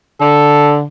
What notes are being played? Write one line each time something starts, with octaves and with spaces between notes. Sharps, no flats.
D3 A4